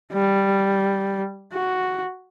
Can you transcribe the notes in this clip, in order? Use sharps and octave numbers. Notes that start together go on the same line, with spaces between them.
G3
F#4